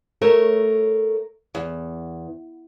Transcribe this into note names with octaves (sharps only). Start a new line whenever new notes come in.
A3 A#4 C#5
E2